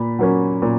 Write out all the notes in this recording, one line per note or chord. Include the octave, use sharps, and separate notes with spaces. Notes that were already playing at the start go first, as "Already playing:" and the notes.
Already playing: A#2 B5
F#3 A#3 C#4
A#2